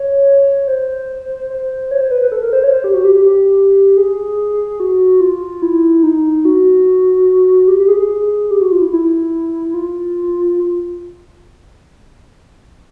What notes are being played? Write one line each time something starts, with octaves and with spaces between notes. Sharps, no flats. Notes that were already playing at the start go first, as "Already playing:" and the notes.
Already playing: C#5
C5
C5
C#5
C5
B4
B4
A4
A#4
C5
C#5
C5
G4
F#4
G4
G4
G#4
F#4
F4
E4
D#4
F#4
G4
G4
G#4
G#4
G4
F#4
F4
E4
E4
F4